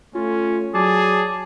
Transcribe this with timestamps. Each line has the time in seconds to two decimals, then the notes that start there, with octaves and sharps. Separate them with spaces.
0.15 A3 C#4 F4
0.75 F#3 G#4 D5 A5